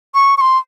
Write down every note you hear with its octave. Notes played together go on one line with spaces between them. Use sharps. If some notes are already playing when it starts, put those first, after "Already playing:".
C#6
C#6
C6